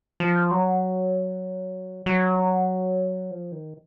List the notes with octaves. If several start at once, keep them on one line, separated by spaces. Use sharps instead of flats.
F3
F#3
F#3
F3
D#3